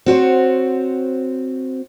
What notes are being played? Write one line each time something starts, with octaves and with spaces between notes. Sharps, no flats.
C4 F#4 C5 C#5